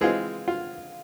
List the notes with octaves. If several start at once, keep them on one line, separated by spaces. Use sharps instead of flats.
E3 G#3 C4 F4 G#4
F4